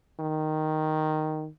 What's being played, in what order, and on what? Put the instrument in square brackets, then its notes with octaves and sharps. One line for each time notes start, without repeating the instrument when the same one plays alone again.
[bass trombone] D#3